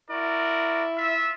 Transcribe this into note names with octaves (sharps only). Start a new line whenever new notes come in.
E4 F#4 A#4 D5
F4 E5